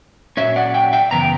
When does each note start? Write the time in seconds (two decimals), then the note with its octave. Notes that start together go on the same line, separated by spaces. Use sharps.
0.37 A#2 F#3 C#4 C#5 E5
0.56 D5 F#5
0.74 E5 G5
0.93 E5 G5
1.11 F#2 C#3 E3 B3 A#5
1.20 G5